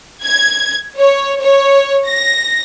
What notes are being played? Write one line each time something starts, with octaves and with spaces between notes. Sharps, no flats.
G#6
C#5
C#5
A#6